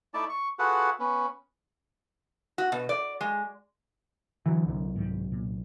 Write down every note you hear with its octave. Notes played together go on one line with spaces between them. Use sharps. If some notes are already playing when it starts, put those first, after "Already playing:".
A3 D#4 E4 D5 A5
C#6
F4 F#4 G#4 A4 B4 F#5
B3 C#4
F#4
B2
D5
G#3
D3 E3 F#3
C2 F#2
G#2 D#3 G3
A#2